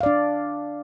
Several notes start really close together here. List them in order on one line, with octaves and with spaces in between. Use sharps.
F5 D5 D4